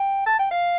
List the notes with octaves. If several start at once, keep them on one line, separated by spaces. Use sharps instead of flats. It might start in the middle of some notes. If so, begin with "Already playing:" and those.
Already playing: G5
A5
G5
F5